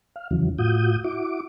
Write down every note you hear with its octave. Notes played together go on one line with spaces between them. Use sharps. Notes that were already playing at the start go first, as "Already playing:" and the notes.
F5
E2 C#3 E3 F#3
A2 F4 F#4 D#6 G6
E4 F#4 D6